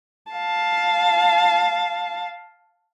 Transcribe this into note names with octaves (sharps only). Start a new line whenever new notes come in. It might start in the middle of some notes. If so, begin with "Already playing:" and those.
F5 A5